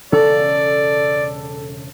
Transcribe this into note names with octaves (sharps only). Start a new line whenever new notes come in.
E1 C#3 C#4 A4 D5